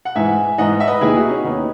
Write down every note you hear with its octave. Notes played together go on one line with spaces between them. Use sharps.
F#5
G#2 E3 E5 G#5
G#2 E3 D#5 F#5
E5
B4 D#5
D#2 D#3 E4 G#4
D#4 F#4
C#4
D#2 D#3 B3 D#4